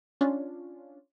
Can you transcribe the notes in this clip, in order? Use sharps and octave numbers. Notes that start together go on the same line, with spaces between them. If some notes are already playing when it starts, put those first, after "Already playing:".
C#4 D4 F4